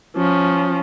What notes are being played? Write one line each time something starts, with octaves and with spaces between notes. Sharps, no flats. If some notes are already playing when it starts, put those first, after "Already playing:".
F3 C#4